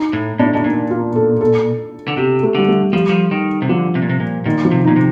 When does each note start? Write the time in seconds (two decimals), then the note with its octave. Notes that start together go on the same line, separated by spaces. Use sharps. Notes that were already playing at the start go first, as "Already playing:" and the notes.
Already playing: D#4
0.13 A2
0.39 A2 D4
0.54 A2 D4
0.64 A#2 D#4
0.90 F4
1.16 A4
1.41 A4
2.08 D3
2.17 C3 G4
2.43 A3
2.55 D3 G3
2.68 A3
2.93 F3 G3
3.09 F3
3.31 D#3
3.62 C3
3.69 D3 F3
3.95 C3
4.02 A#2
4.09 C3
4.20 A#2
4.46 A#2 D#3
4.65 F3
4.71 C3
4.84 A#2 D#4
4.96 C3